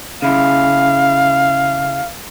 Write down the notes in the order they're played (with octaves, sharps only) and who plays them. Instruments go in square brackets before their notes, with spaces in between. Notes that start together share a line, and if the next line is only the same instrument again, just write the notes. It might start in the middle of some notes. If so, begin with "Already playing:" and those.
[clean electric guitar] C#3 E4 [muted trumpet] F5